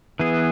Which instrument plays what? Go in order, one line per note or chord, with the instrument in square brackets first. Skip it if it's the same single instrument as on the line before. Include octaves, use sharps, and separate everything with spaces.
[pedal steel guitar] E3 B3 G#4